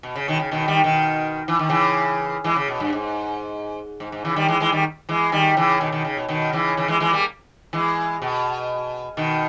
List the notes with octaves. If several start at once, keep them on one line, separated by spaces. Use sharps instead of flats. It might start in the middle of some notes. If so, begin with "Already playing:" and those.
B2
C#3
B2 D#3
C#3
B2 D#3
D#3 G3
B2 D#3
E3
D#3
C#3 E3
E3 G#3
C#3
B2
G2
G#2
G#2
G#2
C#3 E3
D#3 G3
E3 G#3
E3 G#3
D#3 G3
E3 G#3
D#3 G3
C#3 E3
B2 D#3
B2 D#3
C#3
B2
B2 D#3
C#3 E3
C#3 E3
E3 G#3
E3 G#3
G3 A#3
E3 G#3
B2
B2 D#3